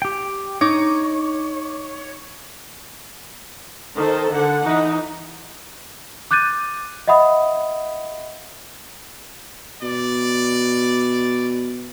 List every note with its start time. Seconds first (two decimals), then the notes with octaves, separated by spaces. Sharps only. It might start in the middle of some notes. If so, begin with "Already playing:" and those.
0.02 G4 G5
0.61 D#4 C#5 D6
3.95 D#3 A4 C5
4.31 D3 F#5
4.63 E3 D#4
6.31 D6 F#6 G6 A6 D#7
7.08 D#5 E5 F#5 B5 D#6
9.82 B2 D5